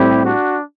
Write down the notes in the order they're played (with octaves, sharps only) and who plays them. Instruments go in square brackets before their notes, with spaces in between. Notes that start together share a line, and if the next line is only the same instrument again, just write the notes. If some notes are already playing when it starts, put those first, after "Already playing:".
Already playing: [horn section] A2 G3 C4 E4 G4
D4 F#4